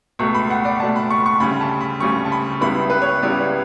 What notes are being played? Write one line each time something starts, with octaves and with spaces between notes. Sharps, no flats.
C#2 B2 A3 C#6
B5
F#5
D5
C#2 B2 A3 A5
B5
C#6
C#6
D2 C#3 G3 B5
A5
B5
D2 C#3 G3 C#6
A5
B5
C#2 C#3 G3 B3 E4 B5
B4
C#5
C#2 C#3 G3 B3 E4 D5